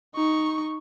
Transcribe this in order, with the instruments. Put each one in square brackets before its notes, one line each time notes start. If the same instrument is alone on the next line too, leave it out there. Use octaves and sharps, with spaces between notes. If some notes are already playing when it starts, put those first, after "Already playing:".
[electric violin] D#4 C#6